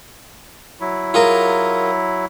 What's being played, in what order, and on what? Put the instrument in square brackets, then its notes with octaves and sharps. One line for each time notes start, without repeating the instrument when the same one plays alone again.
[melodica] F#3 E4
[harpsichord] F4 G#4 A#4